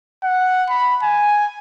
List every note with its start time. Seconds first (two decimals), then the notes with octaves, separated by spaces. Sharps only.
0.24 F#5
0.69 B5
1.03 G#5